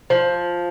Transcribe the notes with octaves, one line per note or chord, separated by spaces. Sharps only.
F3